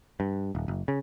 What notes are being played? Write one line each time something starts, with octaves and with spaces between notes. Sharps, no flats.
G2
D#1
F#1
C#3